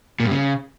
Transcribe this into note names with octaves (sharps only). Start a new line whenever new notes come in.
A#2
G2
C#3